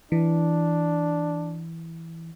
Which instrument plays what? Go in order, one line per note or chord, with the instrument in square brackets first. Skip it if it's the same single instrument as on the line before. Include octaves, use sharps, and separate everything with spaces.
[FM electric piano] E3 [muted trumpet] D4